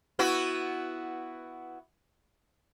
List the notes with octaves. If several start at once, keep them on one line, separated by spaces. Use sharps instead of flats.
B3 E4 F#4